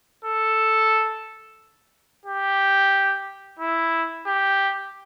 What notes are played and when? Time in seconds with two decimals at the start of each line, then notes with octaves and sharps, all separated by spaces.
0.24 A4
2.25 G4
3.59 E4
4.26 G4